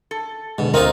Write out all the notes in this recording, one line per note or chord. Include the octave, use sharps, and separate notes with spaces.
A4
B2 D3 G#3
D2 C4 D#4 F4 A#4 D#5